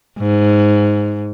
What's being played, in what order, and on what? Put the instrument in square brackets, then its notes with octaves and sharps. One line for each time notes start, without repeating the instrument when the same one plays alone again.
[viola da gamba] G#2